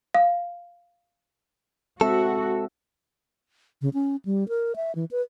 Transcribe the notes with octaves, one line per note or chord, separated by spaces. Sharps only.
F5
G#3 C4 F#4 A4 E5
C#3
C#4
G3
A#4
E5
E3
B4